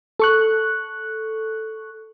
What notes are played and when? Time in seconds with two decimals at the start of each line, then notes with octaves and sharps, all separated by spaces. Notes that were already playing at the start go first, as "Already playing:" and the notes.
0.20 A4 C#6 F#6